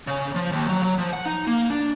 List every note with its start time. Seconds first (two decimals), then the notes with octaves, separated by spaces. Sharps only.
0.07 C#3
0.35 F3
0.52 D#2
0.68 F#3
0.83 F#3
0.98 F3
1.13 F#5
1.26 D#4
1.47 A#3
1.70 D4